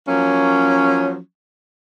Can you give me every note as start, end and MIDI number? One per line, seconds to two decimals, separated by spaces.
0.08 1.18 53
0.08 1.18 54
0.08 1.18 58
0.08 1.18 61